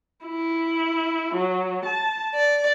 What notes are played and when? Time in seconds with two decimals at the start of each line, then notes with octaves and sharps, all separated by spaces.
0.25 E4
1.34 F#3
1.85 A5
2.35 D5